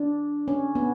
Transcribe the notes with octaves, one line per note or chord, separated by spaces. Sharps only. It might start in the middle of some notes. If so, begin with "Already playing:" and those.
Already playing: D4
C#4
B3